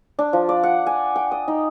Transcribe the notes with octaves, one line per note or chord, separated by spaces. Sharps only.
D4
F3
D5
F#5
G#5
G5
D#6
D#4